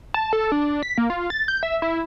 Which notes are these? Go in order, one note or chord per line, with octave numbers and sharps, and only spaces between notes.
A5
A4
D4
B6
A#3
F4
A6
G6
E5
E4